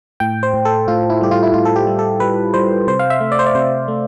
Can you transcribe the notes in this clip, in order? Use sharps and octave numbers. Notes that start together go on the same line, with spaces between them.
A2 G5
C5
A2
A4
A2 F4
E4
G3 G4
F4
E4
A2 F4
A4
G4
G3
A4
G3 B4
G3 C5
C3 C5
F5
E5
A3
D5
C5
D5
C3 C5
A3